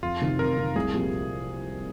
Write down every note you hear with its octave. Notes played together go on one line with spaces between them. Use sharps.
F2 F4
C3 D#3
F2 A#4
C3 D#3
C2 G#4
A#2 F3 C4 G4